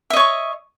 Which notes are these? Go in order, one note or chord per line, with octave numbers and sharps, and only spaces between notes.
C#5 D#5 E5 C#6